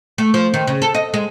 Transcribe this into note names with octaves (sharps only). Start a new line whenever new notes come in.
A3
F3
D#3
C#3
A4
D#5
G#3